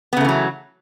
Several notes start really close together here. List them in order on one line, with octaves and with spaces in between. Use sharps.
B3 C#3 A3 E3 F#3